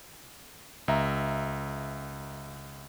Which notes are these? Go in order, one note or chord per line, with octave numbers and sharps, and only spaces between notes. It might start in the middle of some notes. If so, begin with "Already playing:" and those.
C#2 E5 A#5